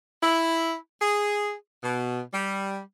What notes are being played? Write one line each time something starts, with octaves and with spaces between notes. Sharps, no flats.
E4
G#4
B2
G3